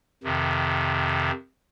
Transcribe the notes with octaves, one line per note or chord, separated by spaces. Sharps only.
F2 C3 D#3